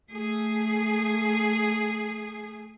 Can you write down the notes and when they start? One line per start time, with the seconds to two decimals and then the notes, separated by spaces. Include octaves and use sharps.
0.12 A3 G#4